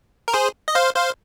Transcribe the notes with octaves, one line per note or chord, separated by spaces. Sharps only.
A#4
G#4 C5
D#5
C5 F5
C5 F5